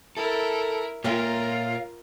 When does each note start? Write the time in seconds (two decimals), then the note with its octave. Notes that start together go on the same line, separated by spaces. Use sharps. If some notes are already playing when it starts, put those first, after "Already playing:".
0.17 E4 A4 A#4
1.04 A#2 F4 A#4 C#5 E5 F5 G5